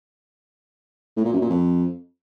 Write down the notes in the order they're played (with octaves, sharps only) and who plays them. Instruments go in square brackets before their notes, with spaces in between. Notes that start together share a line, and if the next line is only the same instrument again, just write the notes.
[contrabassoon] A2
A#2
F#2
A#2
F2